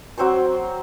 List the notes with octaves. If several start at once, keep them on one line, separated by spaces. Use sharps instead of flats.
F#3 C4 C5 C#6